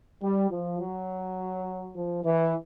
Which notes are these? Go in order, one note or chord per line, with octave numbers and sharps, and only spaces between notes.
G3
F3
F#3
F3
E3